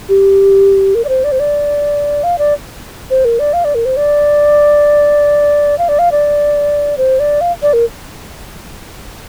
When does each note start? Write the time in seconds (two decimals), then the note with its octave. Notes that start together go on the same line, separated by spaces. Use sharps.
0.09 G4
0.95 A#4
1.04 D5
1.09 C5
1.24 D5
1.32 C5
1.39 D5
2.23 F5
2.38 D5
3.10 C5
3.25 A#4
3.39 D5
3.53 F5
3.64 D5
3.75 A#4
3.85 C5
3.97 D5
5.78 F5
5.88 D5
5.99 F5
6.12 D5
6.97 C5
7.19 D5
7.41 F5
7.62 D5
7.73 A#4